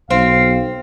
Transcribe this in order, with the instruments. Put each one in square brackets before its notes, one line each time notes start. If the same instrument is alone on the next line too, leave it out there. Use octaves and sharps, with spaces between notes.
[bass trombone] B1 [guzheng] C4 [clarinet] F5